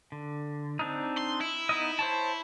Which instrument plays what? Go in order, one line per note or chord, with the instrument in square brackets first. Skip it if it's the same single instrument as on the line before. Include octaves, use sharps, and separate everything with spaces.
[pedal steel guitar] D3
C4 D4 D#4
[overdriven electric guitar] C6
E4
[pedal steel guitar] B3 D#4 D#5
C5 C#5 A5